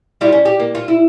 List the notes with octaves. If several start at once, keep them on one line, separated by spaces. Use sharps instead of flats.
G3 E4 F4
C#4
G4
A#3
F4
E4